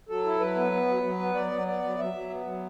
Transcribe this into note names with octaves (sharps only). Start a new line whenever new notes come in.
F#3 A4
E4
F#3 B4
B3
B3
F#3
F#3
B3
F#3 D5
F#3
B3 D5
F#3
F#3 E5
F#3
B3
F#3